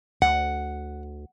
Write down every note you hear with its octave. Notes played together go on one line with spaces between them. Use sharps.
D2 F#5